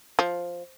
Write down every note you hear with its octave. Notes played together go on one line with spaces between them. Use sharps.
F3